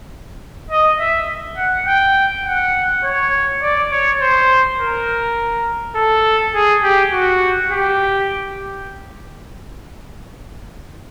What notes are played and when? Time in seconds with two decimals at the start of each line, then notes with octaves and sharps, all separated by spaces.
0.70 D#5
1.00 E5
1.58 F#5
1.87 G5
2.46 F#5
3.04 C#5
3.62 D5
3.91 C#5
4.21 C5
4.79 A#4
5.95 A4
6.55 G#4
6.83 G4
7.12 F#4
7.71 G4